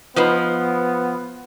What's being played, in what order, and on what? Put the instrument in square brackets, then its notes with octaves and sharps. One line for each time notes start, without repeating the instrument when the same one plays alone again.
[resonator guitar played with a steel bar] F3 [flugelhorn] B3 [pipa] D#4 B4 C5